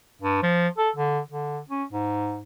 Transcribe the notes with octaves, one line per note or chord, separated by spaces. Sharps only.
G2
F3
A4
D3
D3
C#4
G#2